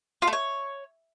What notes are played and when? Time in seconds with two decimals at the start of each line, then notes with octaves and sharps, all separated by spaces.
0.22 F4
0.27 A3
0.33 C#5